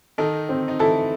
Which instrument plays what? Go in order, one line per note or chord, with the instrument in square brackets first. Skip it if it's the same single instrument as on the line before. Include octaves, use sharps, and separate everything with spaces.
[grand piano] D#3 D#4 [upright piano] A4
[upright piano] C4
[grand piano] D#4
[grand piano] E3 E4 [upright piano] A4